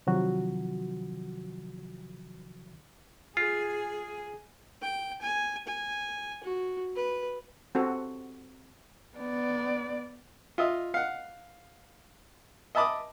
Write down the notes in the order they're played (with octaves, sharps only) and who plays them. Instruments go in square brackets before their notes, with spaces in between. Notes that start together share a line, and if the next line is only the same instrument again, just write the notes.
[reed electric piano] C3 D#3 F3 F#3 F#4
[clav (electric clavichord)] F4 [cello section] G#4
[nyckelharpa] G5
G#5
G#5
F#4
B4
[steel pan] C4 F#4 A4
[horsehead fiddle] B3 D5
[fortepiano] F4 D#5 E5
F5 F#5
D#5 E5 A5 B5 D6 D#6